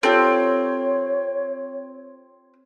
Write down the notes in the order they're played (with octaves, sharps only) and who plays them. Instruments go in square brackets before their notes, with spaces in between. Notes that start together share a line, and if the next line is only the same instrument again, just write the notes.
[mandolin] C4 [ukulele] F4 G4 A4 [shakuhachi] C#5